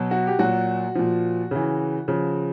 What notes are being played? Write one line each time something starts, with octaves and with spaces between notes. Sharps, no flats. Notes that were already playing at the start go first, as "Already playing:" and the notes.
Already playing: B2 F#3
F#4
G4
A#2 F#3 F#4
A#2 F3
C#3 E3
C#3 F3